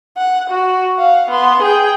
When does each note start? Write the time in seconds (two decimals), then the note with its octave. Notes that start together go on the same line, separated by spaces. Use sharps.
0.17 F#5
0.50 F#4
0.95 F5 F#5
1.30 B3 C6
1.62 G#4 G5